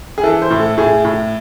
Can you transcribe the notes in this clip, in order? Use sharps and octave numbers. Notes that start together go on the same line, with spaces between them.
G#4
E3 A4
C5
A2
A4
A2 G#4
A2